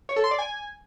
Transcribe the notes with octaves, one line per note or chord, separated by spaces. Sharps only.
C#5
A4
C6
D5
G#5